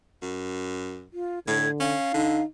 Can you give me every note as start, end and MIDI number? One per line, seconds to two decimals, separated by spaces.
0.22 1.06 42
1.13 1.39 65
1.47 1.68 45
1.47 1.95 50
1.47 1.70 92
1.80 2.10 61
1.80 2.43 77
2.14 2.41 50
2.14 2.44 63